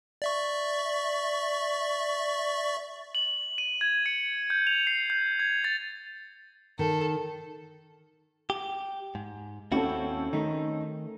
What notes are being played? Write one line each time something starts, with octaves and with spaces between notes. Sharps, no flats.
D5 E5 C#6
F#7
D#7
G#6
C#7
G6
F7
C7
G6
G#6
A6
D#3 A4
G4
G#2
D#2 C4 C#4 E4 F#4 A4
D#3 A3 D#4